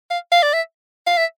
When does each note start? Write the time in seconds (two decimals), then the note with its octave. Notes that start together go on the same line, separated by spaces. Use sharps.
0.11 F5
0.32 F5
0.43 D5
0.54 E5
1.07 F5
1.18 E5